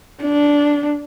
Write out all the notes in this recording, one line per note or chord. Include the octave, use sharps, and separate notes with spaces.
D4